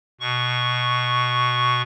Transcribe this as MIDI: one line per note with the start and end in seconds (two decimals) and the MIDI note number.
0.20 1.82 47
0.20 1.82 85